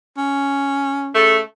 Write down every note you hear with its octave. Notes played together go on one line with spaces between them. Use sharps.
C#4
C#3 A3